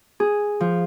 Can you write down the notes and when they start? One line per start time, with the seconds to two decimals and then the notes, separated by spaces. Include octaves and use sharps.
0.20 G#4
0.60 F3